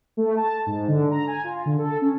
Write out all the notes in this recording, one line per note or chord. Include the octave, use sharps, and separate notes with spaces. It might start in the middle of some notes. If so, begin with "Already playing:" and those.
A3
A5
G#2
D3
A#5
G#5
F4
D3
A4
C#4